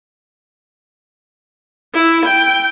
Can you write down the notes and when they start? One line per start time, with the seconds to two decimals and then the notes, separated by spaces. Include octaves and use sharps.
1.94 E4
2.25 G5